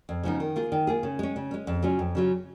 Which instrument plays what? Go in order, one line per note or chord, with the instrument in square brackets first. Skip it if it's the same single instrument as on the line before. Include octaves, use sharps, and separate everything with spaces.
[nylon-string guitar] F2
C#3 F3 B3 D#4
D#3
A#3 F4 G#4
D#3
A#3 F4 G#4
C#3
G#3 C#4
C#3
G#3 C#4
F2
C#3 F#3 C#4 F4
F2
C#3 F#3 C#4 F4